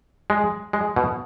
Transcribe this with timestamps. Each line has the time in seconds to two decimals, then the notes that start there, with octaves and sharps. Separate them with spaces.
0.30 G#3
0.73 G#3
0.96 B2